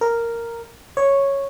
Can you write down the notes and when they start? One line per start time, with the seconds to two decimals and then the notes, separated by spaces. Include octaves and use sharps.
0.01 A#4
0.97 C#5